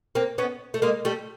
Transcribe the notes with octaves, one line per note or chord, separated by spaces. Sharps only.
A#3 C4
B3 C#4
A3
G#3 A#3
G3 A3